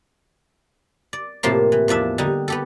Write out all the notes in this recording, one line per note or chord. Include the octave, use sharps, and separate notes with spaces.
D5
A2 C3 F3 A#3 A5 C6
E3
E2 F3 D4 E5
D3 G3 D#4
B3 G4 A4